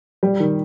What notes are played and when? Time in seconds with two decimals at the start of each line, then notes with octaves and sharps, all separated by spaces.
0.23 G3
0.40 D#3